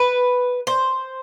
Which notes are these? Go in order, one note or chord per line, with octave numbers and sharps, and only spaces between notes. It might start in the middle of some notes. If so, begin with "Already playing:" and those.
Already playing: B4
C5